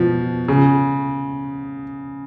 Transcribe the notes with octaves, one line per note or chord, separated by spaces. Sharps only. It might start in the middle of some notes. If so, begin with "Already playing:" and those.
Already playing: B2 F3
C#3